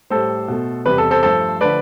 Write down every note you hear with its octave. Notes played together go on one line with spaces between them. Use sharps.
A2 G3 A4 C5
B2 A3
E2 C3 G3 B4
A4
A4 C5
G2 F3 A3 A4 C5
D3 F3 A3 B4 D5